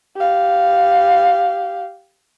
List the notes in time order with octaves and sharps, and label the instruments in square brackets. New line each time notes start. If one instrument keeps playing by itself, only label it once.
[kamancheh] G4 F5